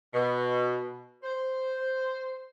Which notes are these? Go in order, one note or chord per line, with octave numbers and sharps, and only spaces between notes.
B2
C5